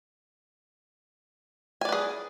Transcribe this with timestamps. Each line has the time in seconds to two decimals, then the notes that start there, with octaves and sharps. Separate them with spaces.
1.81 G#5
1.85 D5
1.89 B4
1.92 G#4